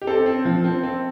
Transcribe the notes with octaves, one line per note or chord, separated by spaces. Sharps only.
G4
C4 A4
C4
F3
C4
C4